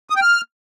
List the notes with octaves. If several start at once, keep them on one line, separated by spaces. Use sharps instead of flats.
D#6
G5
F6